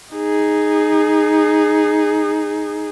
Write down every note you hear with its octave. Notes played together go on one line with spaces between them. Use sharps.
D#4 G#4